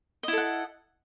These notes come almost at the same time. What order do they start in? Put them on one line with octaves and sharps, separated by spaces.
D#5 E4 A4 F#5